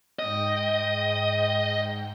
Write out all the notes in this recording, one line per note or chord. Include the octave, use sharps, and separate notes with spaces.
G#2 D#5 G5